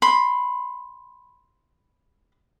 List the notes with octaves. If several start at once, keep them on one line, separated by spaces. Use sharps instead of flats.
B5 C6